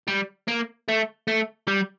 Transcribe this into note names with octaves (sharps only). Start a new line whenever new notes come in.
G3
A#3
A3
A3
G3